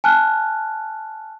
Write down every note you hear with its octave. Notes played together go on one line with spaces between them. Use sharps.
G#5 A5 F6 F#6